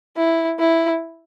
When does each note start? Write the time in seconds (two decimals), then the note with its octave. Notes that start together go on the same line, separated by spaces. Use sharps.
0.17 E4
0.59 E4